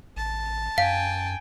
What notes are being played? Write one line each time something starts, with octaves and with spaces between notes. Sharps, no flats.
A1 A5
F#2 F5 G5 G#5